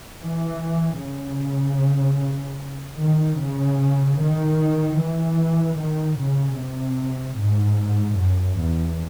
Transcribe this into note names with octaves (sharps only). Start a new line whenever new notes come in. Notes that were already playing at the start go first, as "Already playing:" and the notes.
E3
C#3
D#3
C#3
D#3
E3
D#3
C#3
C3
G#2
F#2
E2